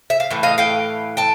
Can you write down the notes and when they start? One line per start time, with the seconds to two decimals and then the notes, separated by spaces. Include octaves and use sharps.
0.10 E5
0.20 F5
0.31 A2 E3
0.43 D#5 F5
0.58 F5 G5
1.17 G5 A5